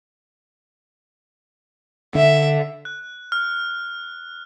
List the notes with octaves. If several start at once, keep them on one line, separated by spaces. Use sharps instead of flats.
D3 E5
F#6
F6